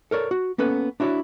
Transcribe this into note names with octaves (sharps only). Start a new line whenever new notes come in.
A4 A#4 C#5 D5
F#4
A#3 B3 C#4 A4 B4
D4 E4 F#4 C#5 D5